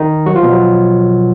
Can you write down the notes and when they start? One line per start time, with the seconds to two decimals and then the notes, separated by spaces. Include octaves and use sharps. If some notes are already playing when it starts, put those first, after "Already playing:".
Already playing: D#3 D#4
0.26 F#3 F#4
0.34 F3 F4
0.43 B2 B3
0.52 F#3